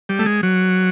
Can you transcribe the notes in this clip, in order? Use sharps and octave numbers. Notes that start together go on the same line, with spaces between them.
G3
A3
G#3
F#3